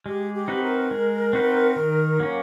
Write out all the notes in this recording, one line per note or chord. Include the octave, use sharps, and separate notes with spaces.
G#3 G4
G4
C4 D#4 F#4 B4
A#4
G#3
C4 D#4 F#4 B4
D#3
F#3 A#3 C#4